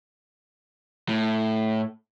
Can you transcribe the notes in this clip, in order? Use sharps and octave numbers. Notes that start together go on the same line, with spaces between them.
A2